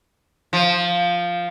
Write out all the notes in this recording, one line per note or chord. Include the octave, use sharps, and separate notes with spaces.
F3